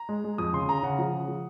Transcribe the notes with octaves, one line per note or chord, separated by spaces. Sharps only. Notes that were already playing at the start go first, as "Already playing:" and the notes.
Already playing: A#5
G#3
G#3
F2 D#6
C#3 C6
C#3 A#5
C#3 F#5
F3
C#3
F3